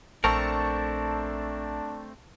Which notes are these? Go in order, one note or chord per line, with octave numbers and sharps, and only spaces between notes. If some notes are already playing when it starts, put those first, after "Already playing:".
A#1 A3 C4 D4 A#4 A5 C#6